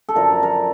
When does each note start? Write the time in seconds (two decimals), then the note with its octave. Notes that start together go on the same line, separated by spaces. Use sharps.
0.09 A4
0.15 F#2 D3 F3 A#4
0.43 A#4